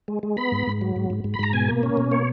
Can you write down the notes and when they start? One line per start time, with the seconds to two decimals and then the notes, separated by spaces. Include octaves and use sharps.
0.08 G#3
0.23 G#3
0.37 B3 B5
0.52 G#2
0.67 G#2
0.81 F#3
0.96 G#2
1.10 G#2
1.24 G#2
1.34 B5
1.39 G#2 A#5
1.53 B2 G#5
1.69 A#3
1.83 C#4
1.97 B2
2.11 A#3 C#5